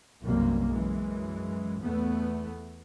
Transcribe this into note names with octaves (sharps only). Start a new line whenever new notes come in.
B1 F#2 C3 G3 A#3
F#2 E3 G#3
E2 A3 B3